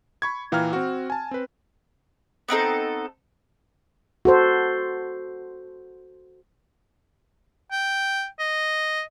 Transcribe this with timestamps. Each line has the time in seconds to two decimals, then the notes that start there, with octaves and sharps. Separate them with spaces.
0.22 B5 C#6 G#6
0.52 A#2 E3 F5 G5 A#5 F6
0.73 C4 F#4
1.10 G#5 A5
1.31 C4 B4
2.48 B3 C4 D#4 A4
4.25 F#4 A4 C5
7.71 G5
8.39 D#5